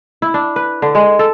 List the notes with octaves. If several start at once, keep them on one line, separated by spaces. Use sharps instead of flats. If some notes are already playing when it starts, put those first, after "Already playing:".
E4
D4
B4
D3
G#3
A4